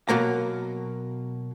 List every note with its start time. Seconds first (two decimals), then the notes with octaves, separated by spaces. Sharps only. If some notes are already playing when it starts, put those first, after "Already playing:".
0.09 B2 F#3 A#3 A#5